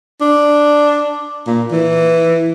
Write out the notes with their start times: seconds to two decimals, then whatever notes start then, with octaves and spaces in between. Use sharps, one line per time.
0.21 D4
1.47 A#2
1.72 E3